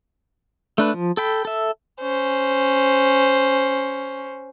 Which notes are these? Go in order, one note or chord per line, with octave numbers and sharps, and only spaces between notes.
A3 D4 B4
F3
A4 G5 B5
A4 E5
C#4 C5